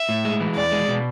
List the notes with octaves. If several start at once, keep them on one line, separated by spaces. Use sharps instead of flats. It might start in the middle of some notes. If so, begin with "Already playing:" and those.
Already playing: E5
A2
G#3
E3
E2 D5
G#3
B2